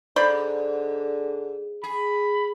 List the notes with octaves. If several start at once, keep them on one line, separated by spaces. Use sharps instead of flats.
G#2 D3 C5 D5 B5
G#4 B5